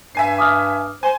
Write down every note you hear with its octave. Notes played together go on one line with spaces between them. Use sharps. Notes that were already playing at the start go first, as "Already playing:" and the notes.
G2 E5 G#5 C7
D6 D#6 F6
C5 G#5